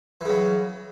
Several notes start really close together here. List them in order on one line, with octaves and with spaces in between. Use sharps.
E3 C#3 F#3